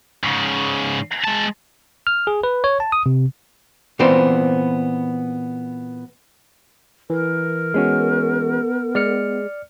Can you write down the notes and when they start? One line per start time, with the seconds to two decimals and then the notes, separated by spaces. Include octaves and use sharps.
0.24 G#2 C#3
1.24 G#3 A5
2.07 F6
2.27 G#4
2.43 B4
2.64 C#5
2.80 A5
2.92 D#6
3.06 C3
3.99 A#2 E3 B3 C4 C5 D5
7.10 E3 A#4
7.74 G#3 B3 C#4 F#4
8.95 G#3 D5 F6 C#7